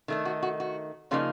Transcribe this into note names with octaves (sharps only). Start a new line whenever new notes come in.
D#3 A3 D#4
F#4
F#4
F#4
C#3 F3 A#3 D#4 F4